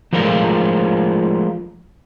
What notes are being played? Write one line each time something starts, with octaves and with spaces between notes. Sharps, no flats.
F3 G#3 A3 F4 A#4